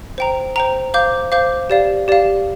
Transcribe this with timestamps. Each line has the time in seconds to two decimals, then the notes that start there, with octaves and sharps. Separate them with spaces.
0.18 C5 G5 A#5
0.56 C5 G5 A#5
0.94 C5 F5 D6 G6
1.32 C5 F5 D6 G6
1.70 G4 D5 F5
2.08 G4 D5 F5